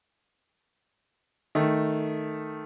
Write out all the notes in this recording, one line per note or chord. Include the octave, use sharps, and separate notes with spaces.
D#3 A3